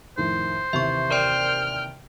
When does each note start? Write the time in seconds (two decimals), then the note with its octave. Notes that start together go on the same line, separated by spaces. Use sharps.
0.18 F2 A2 D#3 C5
0.73 D#2 C3 E3 E5 C#6
1.11 A#4 D5 G5 C6 F6